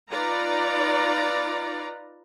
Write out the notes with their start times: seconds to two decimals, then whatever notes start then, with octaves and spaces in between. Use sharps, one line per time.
0.11 D#4 F4 B4 D5 A#5